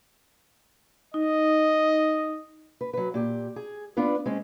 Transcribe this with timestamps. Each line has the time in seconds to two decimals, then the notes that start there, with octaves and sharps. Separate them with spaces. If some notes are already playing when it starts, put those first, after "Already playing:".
1.14 D#4 D#5
2.81 B4
2.93 F#3 B4
3.14 A#2 G4
3.56 G#4
3.97 B3 D4 F4 B4
4.26 G#3 C4 C#4